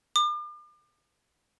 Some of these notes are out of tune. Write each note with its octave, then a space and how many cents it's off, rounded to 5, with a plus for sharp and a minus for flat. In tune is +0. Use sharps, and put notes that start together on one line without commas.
D6 +40